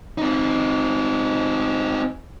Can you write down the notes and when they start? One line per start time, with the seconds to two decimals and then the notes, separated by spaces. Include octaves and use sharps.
0.18 C4 D#4